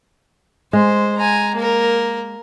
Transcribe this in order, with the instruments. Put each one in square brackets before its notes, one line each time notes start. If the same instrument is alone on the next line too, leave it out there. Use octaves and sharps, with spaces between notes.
[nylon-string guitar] G#3 [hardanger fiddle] C5
[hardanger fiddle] G#5 A#5
A#3 A#4